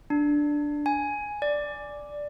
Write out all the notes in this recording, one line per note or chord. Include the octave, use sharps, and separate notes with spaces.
D4
G#5
D5